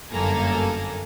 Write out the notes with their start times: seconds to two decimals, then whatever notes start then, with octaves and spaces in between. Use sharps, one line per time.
0.12 G1 F#2 A#3 A4 G#5 A#5